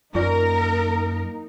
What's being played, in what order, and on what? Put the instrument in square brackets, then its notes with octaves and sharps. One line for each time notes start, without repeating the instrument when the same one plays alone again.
[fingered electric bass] F#2 [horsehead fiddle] A#3 D#4 [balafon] F4 D5 [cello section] A#4